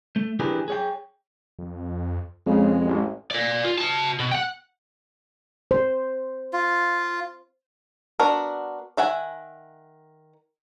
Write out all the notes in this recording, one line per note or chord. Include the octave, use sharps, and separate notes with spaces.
A3
E3 D4 G4 G#4 A#4 B4
G#4 C#5 G5
F2
F2 C#3 G#3
A1
A#4 D5
F4
F#4 A5
B2
F#5 G5
C5
F4
B3 D4 F#4 A#4
D#3 E5 F#5 G#5